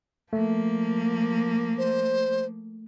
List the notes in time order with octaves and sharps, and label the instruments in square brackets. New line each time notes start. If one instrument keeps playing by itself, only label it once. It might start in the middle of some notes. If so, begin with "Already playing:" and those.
[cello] F3 A#3 [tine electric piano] A3
[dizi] C5